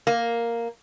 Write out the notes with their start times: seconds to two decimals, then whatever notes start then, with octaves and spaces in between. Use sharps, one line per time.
0.07 A#3